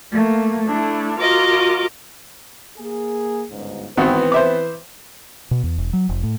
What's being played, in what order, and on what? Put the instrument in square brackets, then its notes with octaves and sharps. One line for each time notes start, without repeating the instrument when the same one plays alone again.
[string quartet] A3 A#3
A3 D4 E4
F4 F#4 A#4 D#5 D6
[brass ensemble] A#3 G#4
G1 C#2 G#2
[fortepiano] G#1 F#4 [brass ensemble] E3 B4 [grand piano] B3 C4
[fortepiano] C5 E5 D6
[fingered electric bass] B2
E2
E1
F#3
F1
A2